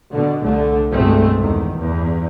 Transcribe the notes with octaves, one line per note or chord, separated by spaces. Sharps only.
B2 D3
C2 D3 A3
G1 C2 B2 G#3 A3 C4
E2 D#3
E2 G2